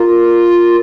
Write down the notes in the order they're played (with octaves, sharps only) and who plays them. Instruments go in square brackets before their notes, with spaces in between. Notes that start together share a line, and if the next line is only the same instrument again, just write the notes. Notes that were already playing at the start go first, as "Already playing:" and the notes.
Already playing: [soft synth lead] F4 [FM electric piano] A#4